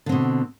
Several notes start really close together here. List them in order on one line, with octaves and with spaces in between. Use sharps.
D3 C4 B2